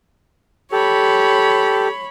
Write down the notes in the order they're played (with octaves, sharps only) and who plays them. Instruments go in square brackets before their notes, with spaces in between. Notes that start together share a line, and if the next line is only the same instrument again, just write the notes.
[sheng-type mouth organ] G4 A4 [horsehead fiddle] C#5 B5